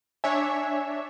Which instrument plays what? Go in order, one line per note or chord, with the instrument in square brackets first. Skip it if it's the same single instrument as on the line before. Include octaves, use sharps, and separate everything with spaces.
[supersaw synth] D4 C#5 E5 [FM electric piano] G#5